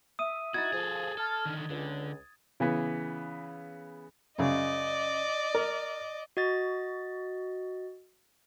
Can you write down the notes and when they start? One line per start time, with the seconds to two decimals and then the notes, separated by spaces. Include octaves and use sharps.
0.19 E5 D#6 D#7
0.54 D#4 E4 F#4 G#6 A6
0.73 F3 G#4 A4
1.18 A4 A5 F6
1.46 D3 D#3
1.69 C#2 D3
2.60 C#3 E3 B3
4.38 F#2 C#3 D5 D#5
5.55 A#4
6.37 F#4 D#5 A6